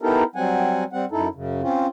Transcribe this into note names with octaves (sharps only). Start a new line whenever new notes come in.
B3 D#4 E4 G4 A4 A#4
F#3 G3 C4 F#5 G#5
G3 C4 F#5
F#2 D#4 E4 A4
F#2 C#3
C4 C#4 F4